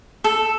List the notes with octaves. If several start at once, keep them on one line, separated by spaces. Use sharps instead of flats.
A4